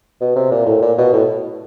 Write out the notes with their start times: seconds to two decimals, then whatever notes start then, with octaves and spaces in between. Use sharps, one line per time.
0.21 B2
0.36 C3
0.51 A#2
0.67 A2
0.82 A#2
0.98 B2
1.13 A2